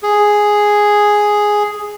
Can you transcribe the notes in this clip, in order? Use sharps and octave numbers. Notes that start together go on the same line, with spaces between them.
G#4